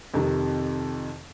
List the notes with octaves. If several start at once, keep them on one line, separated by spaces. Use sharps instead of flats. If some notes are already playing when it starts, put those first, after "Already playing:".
F2 C3 D#3